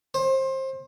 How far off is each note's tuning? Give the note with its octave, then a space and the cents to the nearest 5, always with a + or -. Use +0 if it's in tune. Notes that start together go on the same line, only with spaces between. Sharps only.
C5 +25